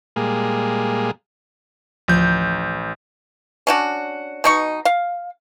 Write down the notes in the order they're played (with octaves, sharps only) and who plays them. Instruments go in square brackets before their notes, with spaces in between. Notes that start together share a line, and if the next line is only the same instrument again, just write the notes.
[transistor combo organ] A#2 G3 G#3 A#3 G#4
[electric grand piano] A1 G6 [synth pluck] D2 F3
[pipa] C#4 D4 F#4
B2 D#4 C#6
F5